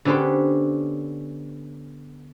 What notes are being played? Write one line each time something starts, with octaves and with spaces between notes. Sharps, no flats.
D3 B3 C#4 G4 B4 C5